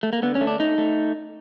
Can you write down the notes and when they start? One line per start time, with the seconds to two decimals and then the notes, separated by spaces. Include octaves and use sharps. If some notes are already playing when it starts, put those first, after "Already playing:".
0.03 A3
0.13 A#3
0.22 D3 B3
0.35 C#4
0.41 A3
0.47 D4
0.59 A3 D#4
0.78 A3